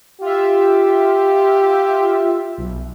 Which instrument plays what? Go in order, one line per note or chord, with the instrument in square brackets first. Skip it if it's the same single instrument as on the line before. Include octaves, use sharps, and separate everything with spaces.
[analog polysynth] F4 E5 [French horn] G4
[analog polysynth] B1